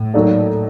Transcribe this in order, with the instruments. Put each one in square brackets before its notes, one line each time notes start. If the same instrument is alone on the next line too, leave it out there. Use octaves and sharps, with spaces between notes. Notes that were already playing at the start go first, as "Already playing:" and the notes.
Already playing: [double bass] A2
[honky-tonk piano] F#3 A#3 D#4 A4 D5